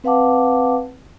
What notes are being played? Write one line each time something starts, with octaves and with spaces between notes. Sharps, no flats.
C4 B4 F5 F#5 A5 D6